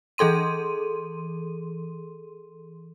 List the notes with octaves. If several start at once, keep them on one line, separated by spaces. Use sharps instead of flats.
E3 G#4 A4 C6 D#7